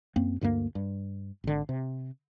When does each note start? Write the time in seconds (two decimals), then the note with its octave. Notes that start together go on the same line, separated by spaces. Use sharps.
0.16 F#2 A#3 C4
0.41 D2 G2 A3 A#3
0.75 G2
1.44 G#1 D3
1.69 C3